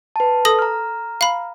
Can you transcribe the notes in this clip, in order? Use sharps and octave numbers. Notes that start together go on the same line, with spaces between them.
B4 A5
A4 D#6 A#6
A#5 F6
F5 B5